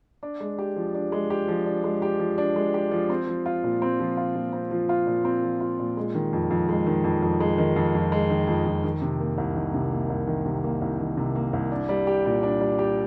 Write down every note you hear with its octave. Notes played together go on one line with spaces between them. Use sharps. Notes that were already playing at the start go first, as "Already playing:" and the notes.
D4
G#3
G4
F3
D4
G#3
G4
F3
D4
G#3
G4
F3
D4
G#3
G4
F3
C4
F3
F4
A#2
C4
F3
F4
A#2
C4
F3
F4
A#2
C4
F3
F4
A#2
G#3
D#3
F2
F2
G#3
D#3
F2
F2
G#3
D#3
F2
F2
G#3
D#3
F2
F2
D#3
C3
A#3
C2
D#3
C3
A#3
C2
D#3
C3
A#3
C2
D#3
C3
A#3
C2
D4
G3
G4
A#2
D4
G3
G4